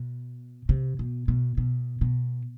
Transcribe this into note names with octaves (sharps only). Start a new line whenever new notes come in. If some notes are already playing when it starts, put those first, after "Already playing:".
Already playing: B2
C3
B2
B2
B2
B2